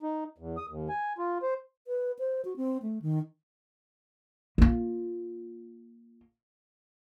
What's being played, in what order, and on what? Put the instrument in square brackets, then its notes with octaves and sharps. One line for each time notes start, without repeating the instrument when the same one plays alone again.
[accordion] D#4
E2
D#6
D#2
G#5
F4
C5
[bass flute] B4
C5
F#4
C4
A3
D#3
[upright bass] A#3 F4